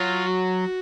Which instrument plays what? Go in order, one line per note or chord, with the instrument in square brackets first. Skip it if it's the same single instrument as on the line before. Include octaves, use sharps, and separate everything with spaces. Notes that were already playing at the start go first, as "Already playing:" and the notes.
Already playing: [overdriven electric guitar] F#3 [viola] F4
[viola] F#4